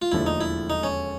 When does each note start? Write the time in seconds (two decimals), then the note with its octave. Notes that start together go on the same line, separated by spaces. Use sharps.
0.02 F4
0.12 E1 D#2 D3 F3 A3 E4
0.26 D#4
0.41 E4
0.70 D#4
0.83 C#4